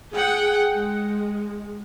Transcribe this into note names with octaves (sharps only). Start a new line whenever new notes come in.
G#4 F#5 G5
G#3